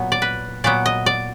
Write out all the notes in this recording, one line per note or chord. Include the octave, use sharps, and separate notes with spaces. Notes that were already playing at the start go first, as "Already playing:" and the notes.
Already playing: A#2 F#3 B3
D5
B4
A#2 F#3 B3 D5
D#5
D5